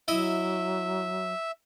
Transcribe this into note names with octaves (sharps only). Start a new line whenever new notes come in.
F#3 E4 D#5 E5